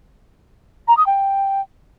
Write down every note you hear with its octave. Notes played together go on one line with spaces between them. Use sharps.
A#5
D#6
G5